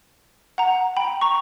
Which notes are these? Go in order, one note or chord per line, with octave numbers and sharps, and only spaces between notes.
F#5 A#5
G5 B5
A#5 C#6